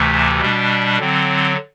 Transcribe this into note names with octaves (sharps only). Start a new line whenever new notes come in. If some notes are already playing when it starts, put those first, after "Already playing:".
Already playing: D2 C3 E3 A3
B2 G3 D4
D3 F#3 C4